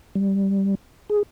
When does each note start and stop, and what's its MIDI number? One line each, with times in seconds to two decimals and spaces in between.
0.15 0.75 55
1.10 1.23 68